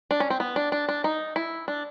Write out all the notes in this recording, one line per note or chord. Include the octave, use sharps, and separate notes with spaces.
D4
C#4
C4
B3
D4
D4
D4
D#4
E4
D4